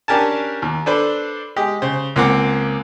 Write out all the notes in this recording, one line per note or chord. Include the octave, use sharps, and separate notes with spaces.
C#4 D4 G4 A#4 G#5 A5
D#2
D4 A4 B4 C5 D5
G#3 G4 D#5
C#3 C5
C#2 A#3 C4 F#5 D6